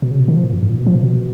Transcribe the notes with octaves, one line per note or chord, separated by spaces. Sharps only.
B2
C#3
B2
D#3
F3
A#2
F#2
G#2
A#2
B2
F3
A#2
B2